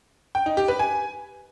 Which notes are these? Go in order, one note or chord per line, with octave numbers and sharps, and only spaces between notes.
G5
D#4
G4
B4
G#5